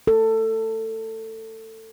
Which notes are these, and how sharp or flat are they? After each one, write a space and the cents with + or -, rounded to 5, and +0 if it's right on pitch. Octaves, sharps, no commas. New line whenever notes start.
A4 +20